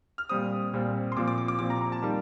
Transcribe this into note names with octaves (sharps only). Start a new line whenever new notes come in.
F6
A#2 G3 C4 D#6
A#2 G3 C4
C6
A#2 F3 C4 D6
D6
D6
D6
A#2 F3 C4 D6
A#5
A#5
A5
D#3 G3 A#3